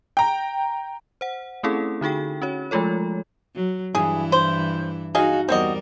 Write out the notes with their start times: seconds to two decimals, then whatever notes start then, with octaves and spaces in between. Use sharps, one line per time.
0.17 G5 A#5
1.21 C5 F#5
1.63 A3 C4 C#4 E4 G#4 A4
2.01 D3 D#4 F#4 G#4 G5
2.42 C#4 F#4 C#5
2.71 F3 G#3 A3 F4 A4 C#5
3.55 F#3
3.95 G2 E3 E4 G#4
4.32 C5
5.15 D#4 F#4 G#4 D#5 F5
5.48 E2 G3 C4 F#4 A#4 D#5